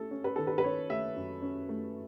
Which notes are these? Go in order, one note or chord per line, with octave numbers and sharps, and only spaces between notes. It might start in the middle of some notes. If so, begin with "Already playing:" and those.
Already playing: A3 C#4 A4
C#4
B4
D#3 A4
B4
B4
C#4 C#5
A3 E5
F#2
C#4
A3